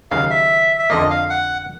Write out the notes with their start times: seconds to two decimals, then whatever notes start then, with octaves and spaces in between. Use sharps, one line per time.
0.11 D#2 C#3 F#3 F5
0.31 E5
0.79 E5
0.90 F2 D3 F3 A#3 D#5
1.10 F5
1.30 F#5